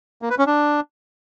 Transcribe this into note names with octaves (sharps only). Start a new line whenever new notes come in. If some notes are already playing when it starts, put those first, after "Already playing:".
A#3
B4
C#4
D4